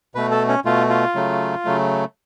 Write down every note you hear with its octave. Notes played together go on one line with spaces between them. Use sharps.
B2 A3 B4
A4
C#4
B2 A3 F4
F4
C#3 F#3 A3
C#3 F#3 A3